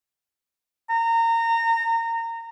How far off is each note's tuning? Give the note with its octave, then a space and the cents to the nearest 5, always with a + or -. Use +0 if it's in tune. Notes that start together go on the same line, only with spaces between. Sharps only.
A#5 -25